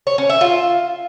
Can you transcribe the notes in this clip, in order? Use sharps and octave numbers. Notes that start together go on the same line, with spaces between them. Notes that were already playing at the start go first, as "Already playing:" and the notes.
C#5
C#4
E5
F4